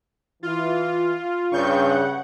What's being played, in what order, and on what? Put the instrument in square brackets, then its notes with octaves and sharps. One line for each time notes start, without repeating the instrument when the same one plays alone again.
[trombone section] E3 [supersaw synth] F4
[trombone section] G2 C#3 [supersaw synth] C#6 G6
[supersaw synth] F#5